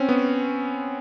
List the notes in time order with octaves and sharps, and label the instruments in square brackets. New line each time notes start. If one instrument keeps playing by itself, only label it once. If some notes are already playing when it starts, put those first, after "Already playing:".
Already playing: [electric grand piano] C4 C#4
B3